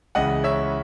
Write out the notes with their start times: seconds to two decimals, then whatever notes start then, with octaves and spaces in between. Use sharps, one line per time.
0.15 C#2 C#3 E3 D#5 F#5
0.44 C#5 E5